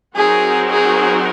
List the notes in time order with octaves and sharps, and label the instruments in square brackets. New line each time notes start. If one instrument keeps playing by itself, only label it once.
[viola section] F#3 C4 D#4 F#4 A#4 [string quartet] G#4
[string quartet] G#4